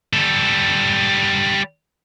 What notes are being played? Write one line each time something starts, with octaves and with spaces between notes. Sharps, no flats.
G3 A4